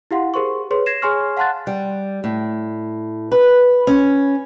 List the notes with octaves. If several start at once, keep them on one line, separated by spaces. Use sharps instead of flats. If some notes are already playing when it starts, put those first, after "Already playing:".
E4 G4 F5 F#5 C6
G4 G#4 A#4 C5 C6 C#6
G#4 B4 C#5 C6
G#6 A#6 C7 E7
G#4 C#5 G#5 C6 C#6 F6
F5 F#5 A5 C6 F#6 A6
G3
A2
B4
C#4